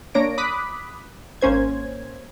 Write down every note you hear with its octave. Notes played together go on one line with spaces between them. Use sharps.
A#3 D4 C#5 A#6 D7
B5 D6 D#6 F#6 B6
G#1 A#3 C#4 C5 G#6